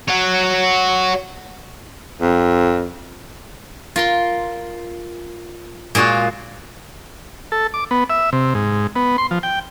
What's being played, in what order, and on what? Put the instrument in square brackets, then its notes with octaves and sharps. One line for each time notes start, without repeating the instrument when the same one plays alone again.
[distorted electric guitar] F#4 C#5
[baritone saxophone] F2
[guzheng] F4 A#4 C6
A#2 G#3 F4 F#4 C#5
[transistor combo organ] A4
D6
B3
E5
C3
G#2
B3
C6
F3
G5